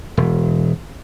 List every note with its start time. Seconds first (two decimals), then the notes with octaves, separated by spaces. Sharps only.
0.17 E1